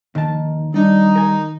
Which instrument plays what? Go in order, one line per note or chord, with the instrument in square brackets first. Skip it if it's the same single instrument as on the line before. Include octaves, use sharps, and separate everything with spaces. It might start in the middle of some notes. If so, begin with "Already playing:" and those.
[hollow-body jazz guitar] D#2 A5 [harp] D#3
[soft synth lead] G3 [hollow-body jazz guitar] D4 [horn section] D#4
[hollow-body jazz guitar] A#4 G#5